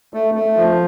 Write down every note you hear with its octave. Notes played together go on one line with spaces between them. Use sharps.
A3
A3
F3